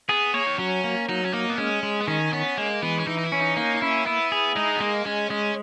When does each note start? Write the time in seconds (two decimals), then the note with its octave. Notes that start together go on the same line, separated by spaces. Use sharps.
0.09 B3 G#4
0.34 A#3 C#5
0.47 D#4
0.58 F#3 C#4
0.84 A#3
1.09 F#3 D#4
1.25 C#4
1.33 A#3 D#4
1.50 B3
1.58 G#3 C#4
1.83 G#3
2.01 B3
2.08 D#3 C#4
2.33 B3 C#4
2.57 G#3 A#3
2.82 E3 B3
2.99 C#4
3.07 E3 D#4
3.18 D#4
3.24 E4
3.32 C#4
3.40 D#4
3.57 A#3 D#4
3.77 D#4
3.82 C#4 E4
4.06 B3 E4
4.32 G#4
4.56 G#3 D#4
4.76 B3
4.80 G#3 A#3
5.05 G#3 C#4
5.30 G#3 C#4